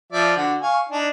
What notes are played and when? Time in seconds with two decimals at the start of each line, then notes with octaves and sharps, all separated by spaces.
0.12 F3 D5 E5
0.37 D3 F#4
0.62 F5 G#5 C#6
0.89 D4 D#4